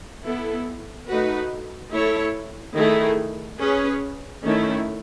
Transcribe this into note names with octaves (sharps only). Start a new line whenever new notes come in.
B3 E4 A4
A3 D#4 F#4 B4
A3 E4 A4 C#5
D#3 A3 E4 G#4
C#4 G#4 B4
D#3 A3 C#4 E4